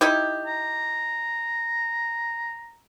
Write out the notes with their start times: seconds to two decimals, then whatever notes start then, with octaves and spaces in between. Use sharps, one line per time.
0.01 D#4 E4 G4
0.46 A#5